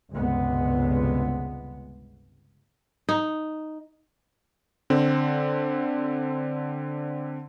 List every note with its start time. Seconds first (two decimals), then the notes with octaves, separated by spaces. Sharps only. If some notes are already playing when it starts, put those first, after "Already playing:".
0.11 G1 C#2 C3 G#3 B3
3.09 D#4
4.90 D3 C4